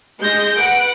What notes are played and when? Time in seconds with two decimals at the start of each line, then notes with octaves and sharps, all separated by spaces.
0.22 G#3 G6 A#6
0.57 B4 F#5 D7